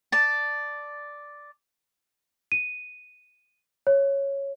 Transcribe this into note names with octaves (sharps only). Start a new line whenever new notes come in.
D5 A5
D#7
C#5